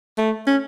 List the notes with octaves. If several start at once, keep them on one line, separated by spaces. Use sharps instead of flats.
A3
C#4